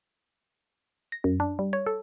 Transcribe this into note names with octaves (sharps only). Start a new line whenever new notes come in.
A#6
F#2
D4
G3
C#5
A4